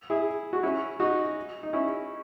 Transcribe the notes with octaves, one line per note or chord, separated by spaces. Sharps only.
E4 G#4
F#4
C#4 E4
D#4 F#4
D#4
C#4 E4